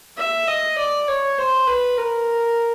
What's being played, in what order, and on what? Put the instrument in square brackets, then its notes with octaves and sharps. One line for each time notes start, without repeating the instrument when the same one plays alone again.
[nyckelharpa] E5
D#5
D5
C#5
C5
B4
A#4